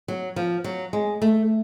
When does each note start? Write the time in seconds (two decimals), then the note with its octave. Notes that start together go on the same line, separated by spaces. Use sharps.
0.08 F#3
0.36 F3
0.64 F#3
0.93 G#3
1.22 A3